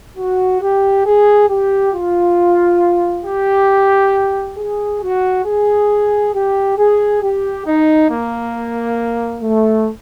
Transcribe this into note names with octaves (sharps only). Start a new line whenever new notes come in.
F#4
G4
G#4
G4
F4
G4
G#4
F#4
G#4
G4
G#4
G4
D#4
A#3
A3